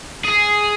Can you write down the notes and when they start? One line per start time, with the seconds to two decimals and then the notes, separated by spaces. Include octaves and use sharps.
0.25 G#4